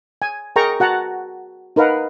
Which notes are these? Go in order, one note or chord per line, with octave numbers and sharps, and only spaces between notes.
G#5
G#4 A#4 G5 A#5 C#6
F#4 F#5 A5 A#5
D#4 A#4 B4 F5 F#5